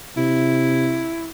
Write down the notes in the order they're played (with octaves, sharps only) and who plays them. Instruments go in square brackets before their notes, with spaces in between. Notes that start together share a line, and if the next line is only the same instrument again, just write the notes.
[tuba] C3 [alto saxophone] E4